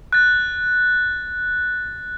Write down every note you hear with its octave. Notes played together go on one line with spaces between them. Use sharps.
F#6 A6